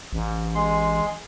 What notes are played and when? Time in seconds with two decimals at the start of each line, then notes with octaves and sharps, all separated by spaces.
0.13 A1
0.55 G#3 C6